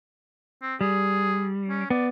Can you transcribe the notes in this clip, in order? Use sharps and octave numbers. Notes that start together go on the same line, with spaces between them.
C4
G3 G#4
C#4
B3 D5